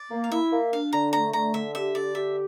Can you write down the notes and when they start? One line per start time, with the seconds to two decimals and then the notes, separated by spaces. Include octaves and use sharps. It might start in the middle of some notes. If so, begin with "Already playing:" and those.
Already playing: D5
0.11 A#3
0.24 F5
0.32 E4 E5
0.52 A#3
0.73 D4 F5
0.93 D3 A#5
1.13 A3 A#5
1.33 D3 A#5
1.54 D3 E5
1.75 G4 E5
1.95 D3 D5
2.15 G4 E5